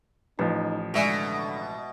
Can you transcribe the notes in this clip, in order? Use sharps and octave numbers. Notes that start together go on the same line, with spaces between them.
A1 F3 D#4 B4
B2 D3 G#3 D5 E5 G#5